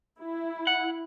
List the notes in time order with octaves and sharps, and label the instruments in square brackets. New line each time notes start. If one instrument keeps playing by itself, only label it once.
[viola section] E4
[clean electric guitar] F#5